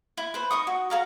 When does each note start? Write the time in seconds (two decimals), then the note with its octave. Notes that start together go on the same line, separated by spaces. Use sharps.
0.17 E4
0.34 B4 C5
0.51 D#4 C#6 D#6
0.67 F#4
0.90 F#4 A4 F5 A#5